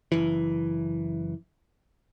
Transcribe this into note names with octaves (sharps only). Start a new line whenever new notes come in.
F#1 E3